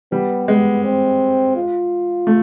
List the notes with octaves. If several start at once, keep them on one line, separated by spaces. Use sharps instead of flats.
G3 B3
G#3 B3
C4
F4
A3